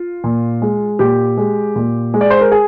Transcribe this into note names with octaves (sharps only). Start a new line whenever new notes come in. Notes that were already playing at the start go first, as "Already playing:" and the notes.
Already playing: F4
A#2
G#3
A#2 G4
G#3
A#2
G#3
D5
C5
A#4
G#4